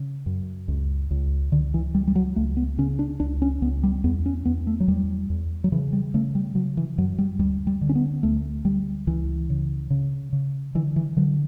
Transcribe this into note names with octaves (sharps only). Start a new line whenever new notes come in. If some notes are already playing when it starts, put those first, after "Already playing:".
Already playing: C#3
F#2
C#2
C#2
C#2 D3
E3
C#2 G3
G3
F#3
C#2 A3
B3
C#3 C#4
D4
C#2 D4
C#4
C#2 B3
G3
E2 B3
C#4
E2 B3
A3
F#3
E2 G3
E2
F#3
C#3 E3
G3
C#3 A3
G3
C#3 F#3
E3
F#2 F#3
G3
D2 G3
G3
D3
C#4
B3
D2 A3
D2 G3
C#2 E3
C#3
C#3
C#3
D3 E3
E3
D3 F#3